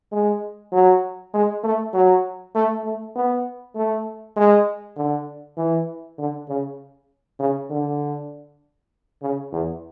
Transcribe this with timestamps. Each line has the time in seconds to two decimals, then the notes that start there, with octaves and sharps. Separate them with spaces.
0.12 G#3
0.73 F#3
1.34 G#3
1.64 A3
1.94 F#3
2.55 A3
2.84 A3
3.16 B3
3.76 A3
4.37 G#3
4.97 D3
5.57 E3
6.18 D3
6.49 C#3
7.40 C#3
7.70 D3
9.22 C#3
9.52 E2